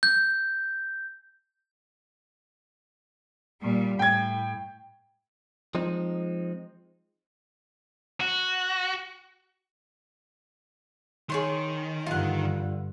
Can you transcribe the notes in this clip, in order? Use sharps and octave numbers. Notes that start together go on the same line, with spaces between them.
G6
A#2 G3
A2 G5 G#6
F3 G#3 C4 D#4
F#4
D#3 G#4 C#5 C6
G2 D3 F4 F#5